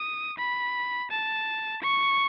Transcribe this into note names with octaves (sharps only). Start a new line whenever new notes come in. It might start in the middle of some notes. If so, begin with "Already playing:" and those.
Already playing: D#6
B5
A5
C#6